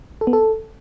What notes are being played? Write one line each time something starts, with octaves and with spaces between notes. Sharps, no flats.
A4
B3
A4